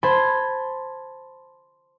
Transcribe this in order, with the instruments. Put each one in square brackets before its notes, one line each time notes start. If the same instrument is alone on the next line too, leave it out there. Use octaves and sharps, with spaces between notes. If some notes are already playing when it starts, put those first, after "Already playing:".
[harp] C5 A5 B5 C6 G#6